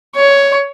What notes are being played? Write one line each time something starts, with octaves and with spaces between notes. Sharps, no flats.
C#5